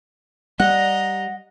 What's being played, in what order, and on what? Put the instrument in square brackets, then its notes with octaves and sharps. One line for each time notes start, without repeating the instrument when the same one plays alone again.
[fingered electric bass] G3 [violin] D#5 A#5 [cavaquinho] F#5